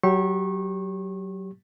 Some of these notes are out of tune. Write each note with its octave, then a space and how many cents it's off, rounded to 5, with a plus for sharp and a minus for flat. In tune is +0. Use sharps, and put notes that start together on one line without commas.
F#3 +20 G4 +0 C#6 -30